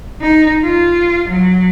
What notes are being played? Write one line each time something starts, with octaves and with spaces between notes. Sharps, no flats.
D#4
F4
F#3